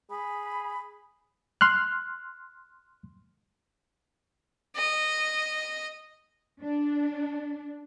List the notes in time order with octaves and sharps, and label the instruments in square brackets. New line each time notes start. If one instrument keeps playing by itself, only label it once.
[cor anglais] G#4 [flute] B5
[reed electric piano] C6 F6 F#6
[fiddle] D#5
[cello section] D4